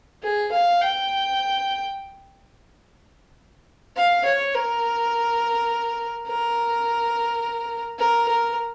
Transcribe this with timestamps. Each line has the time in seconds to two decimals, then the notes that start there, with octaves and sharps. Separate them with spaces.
0.23 G#4
0.52 F5
0.81 G5
3.97 F5
4.25 C#5
4.55 A#4
6.27 A#4
7.99 A#4
8.28 A#4